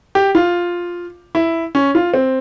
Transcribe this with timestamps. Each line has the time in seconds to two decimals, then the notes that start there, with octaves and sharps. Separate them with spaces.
0.15 G4
0.35 F4
1.35 E4
1.75 C#4
1.95 F4
2.14 C4